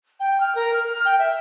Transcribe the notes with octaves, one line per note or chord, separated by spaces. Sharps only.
G5
F6
A#4
F6
G5
E5